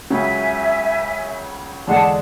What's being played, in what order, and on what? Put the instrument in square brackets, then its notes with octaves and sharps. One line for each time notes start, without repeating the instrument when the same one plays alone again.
[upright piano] C#2 C#3 F#3 [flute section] E5 G#5
[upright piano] E2 D3 G#3 D4 G#4 [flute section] F#5 A5